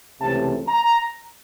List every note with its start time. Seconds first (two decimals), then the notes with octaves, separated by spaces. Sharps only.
0.21 C#2 C3 E3 A3 C#4 A5
0.69 A#5